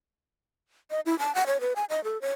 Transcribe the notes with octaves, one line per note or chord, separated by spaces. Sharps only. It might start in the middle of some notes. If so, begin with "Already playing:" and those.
D#5
E4
A5
F#5
C#5
B4
G#5
D#5
A4
C#5